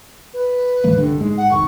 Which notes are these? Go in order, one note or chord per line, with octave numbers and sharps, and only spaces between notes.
B4
A1 D#2 A2 E3 G#3 A#3
C2 G2 D3
G#2 G#3
F#5
F1 B1 D#3 C#6